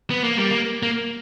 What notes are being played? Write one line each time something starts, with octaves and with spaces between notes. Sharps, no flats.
B3
A#3
G3
A#3
A#3